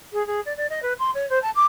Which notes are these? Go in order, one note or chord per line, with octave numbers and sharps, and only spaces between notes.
G#4
G#4
D5
D5
D#5
B4
C6
C#5
C5
A5
D6